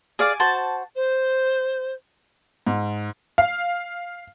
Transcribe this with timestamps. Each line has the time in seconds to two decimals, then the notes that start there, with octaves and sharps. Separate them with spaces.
0.19 G#4 D5 F5 G#5 D6
0.40 F#4 C5 A5
0.95 C5
2.67 G#2
3.38 F5